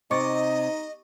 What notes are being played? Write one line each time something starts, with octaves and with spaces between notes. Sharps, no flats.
C3 D#4 D#5 C#6 D6 A6